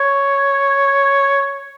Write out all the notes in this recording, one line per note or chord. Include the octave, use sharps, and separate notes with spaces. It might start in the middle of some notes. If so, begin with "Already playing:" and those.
Already playing: C#5